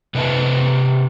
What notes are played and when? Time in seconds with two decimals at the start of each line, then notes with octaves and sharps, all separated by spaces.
0.15 C3 B4 D#5 E5 A5